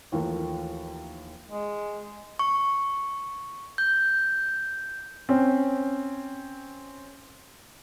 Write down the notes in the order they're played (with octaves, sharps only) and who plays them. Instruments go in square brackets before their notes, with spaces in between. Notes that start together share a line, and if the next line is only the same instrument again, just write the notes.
[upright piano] D#2 E3 F3 A3 A#4
[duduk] G#3
[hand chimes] C#6
G6
[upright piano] C4 C#4